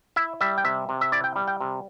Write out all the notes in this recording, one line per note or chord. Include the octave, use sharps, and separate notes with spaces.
E4 E5
G3 E5
G5
C3 E5
C3
E5
E4 D5
G5
G3
G5
C3